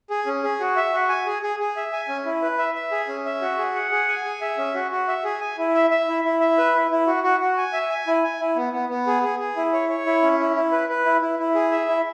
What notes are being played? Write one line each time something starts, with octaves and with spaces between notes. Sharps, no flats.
G#4
C#4
G#4
F#4
E5
F#4
G#5
G#4
G#4
G#4
E5
G#5
C#4
E4
B4
E5
E5
G#4
C#4
E5
F#4
G#4
F#5
G#4
G#5
G#4
E5
C#4
F#4
F#4
E5
G#4
G#5
E4
E5
E5
E4
E4
E5
B4
E4
E4
F#4
F#4
F#4
G#5
E5
G#5
E4
G#5
E4
B3
B3
B3
G#4
G#4
G#4
E4
C#5
C#5
E4
C#4
E4
E4
B4
B4
E4
E4
E4
G#4
E5
E4